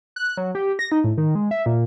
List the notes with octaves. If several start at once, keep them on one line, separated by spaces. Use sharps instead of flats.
F#6
F#3
G4
A#6
D#4
A2
D#3
G#3
E5
A#2